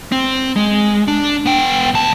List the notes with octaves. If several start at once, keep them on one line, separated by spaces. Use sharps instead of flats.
C4
G#3
D4
B3 G5
D2 A5